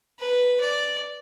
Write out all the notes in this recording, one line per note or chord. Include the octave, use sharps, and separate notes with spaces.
B4
D5